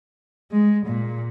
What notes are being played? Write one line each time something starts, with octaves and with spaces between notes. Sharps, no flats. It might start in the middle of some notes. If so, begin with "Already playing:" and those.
G#3
A#2